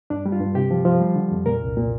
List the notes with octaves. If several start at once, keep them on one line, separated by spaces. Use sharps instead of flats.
G2 D4
G3
F4
G2
C3 G4
F3
F3
G3
D3
F2
A#2 A#4
C2
A#2